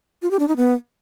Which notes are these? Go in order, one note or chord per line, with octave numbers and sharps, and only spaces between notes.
F4
G4
D4
D#4
B3